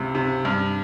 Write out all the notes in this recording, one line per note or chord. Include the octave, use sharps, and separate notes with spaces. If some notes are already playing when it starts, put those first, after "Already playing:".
Already playing: C#2 C3
C3
G2